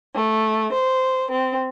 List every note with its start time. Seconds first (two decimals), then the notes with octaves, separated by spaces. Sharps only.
0.14 A3
0.72 C5
1.31 C4